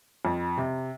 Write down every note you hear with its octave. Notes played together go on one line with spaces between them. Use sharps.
F2
C3